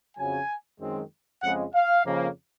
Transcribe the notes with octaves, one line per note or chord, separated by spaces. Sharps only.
F2 C#3 F#3 G#5
F#2 D#3 G#3 C4
F2 C#3 G#3 F#5
F5
F2 C#3 F3 A#3